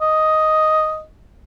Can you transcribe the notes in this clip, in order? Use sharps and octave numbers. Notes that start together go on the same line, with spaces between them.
D#5